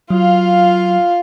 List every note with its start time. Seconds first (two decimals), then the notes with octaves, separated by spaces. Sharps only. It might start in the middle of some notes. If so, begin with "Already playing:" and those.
0.10 F#3 F4 F5